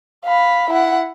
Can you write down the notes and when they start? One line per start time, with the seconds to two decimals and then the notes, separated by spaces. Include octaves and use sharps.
0.25 F5 B5
0.70 E4 F#5